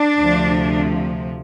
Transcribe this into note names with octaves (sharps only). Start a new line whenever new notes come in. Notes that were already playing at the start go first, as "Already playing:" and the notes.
Already playing: D4
D2 C3 F3